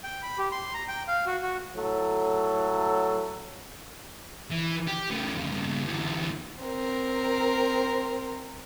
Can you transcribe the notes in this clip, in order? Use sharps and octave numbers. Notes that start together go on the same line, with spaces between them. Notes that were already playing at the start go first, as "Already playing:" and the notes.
G5
B5
G4
C6
A#5
G5
F5
F#4
F#4
A2 F#3 A4
E3
G4
C#3 A3
F2 C#3
G2 C#3
D2 E3
C4 A#4